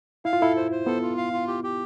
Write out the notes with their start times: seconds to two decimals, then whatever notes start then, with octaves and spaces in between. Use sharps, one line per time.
0.25 E4 F5
0.33 F4
0.41 E4 A4
0.56 C5
0.71 C5
0.86 B3 A4
1.02 F4
1.17 F5
1.33 F4
1.47 G4
1.63 G4